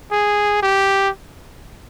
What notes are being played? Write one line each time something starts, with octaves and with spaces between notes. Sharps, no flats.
G#4
G4